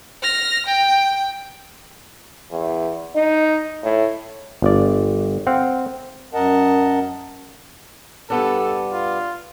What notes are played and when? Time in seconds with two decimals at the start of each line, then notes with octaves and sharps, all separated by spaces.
0.23 F6 A#6
0.66 G5
2.52 E2
3.16 D#4
3.84 A2
4.62 G1 D5
5.47 C4 F5 F#5
6.34 F#2 A#4 D#5 F#5 A5
8.30 G2 B3 D4 A4
8.92 F4